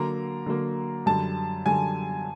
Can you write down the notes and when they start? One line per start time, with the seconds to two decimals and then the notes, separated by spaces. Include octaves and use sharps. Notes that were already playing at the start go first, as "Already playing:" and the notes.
Already playing: D3 F#3 A#3 A#5
0.46 D3 F#3 A#3
1.06 F#2 D3 G3 A5
1.66 F#2 D3 G3 G#5